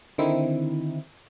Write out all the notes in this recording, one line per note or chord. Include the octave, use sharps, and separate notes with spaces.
D3 D#3 C4 D#4 E4